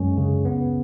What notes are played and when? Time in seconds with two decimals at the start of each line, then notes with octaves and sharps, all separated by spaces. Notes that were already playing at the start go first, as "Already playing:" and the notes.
Already playing: F#2 G#3 C#4
0.17 C#3
0.45 B3